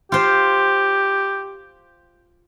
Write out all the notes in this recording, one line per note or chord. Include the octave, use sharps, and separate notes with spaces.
F4 G4 C5